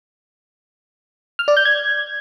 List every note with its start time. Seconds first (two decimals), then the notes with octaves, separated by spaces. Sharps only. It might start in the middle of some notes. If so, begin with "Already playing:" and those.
1.39 F6
1.48 D5
1.57 G6
1.65 G#6